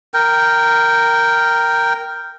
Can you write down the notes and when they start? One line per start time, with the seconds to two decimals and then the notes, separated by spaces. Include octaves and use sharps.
0.14 A#4 G5